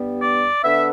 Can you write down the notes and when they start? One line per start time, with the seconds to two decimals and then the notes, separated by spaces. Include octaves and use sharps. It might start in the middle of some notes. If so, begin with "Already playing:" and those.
Already playing: G2 G3 B3
0.21 D5
0.63 D3 B3 D4 E5